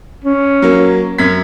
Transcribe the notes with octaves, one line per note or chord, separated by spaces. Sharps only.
C#4
F#3 A#3
F#2 G#6 B6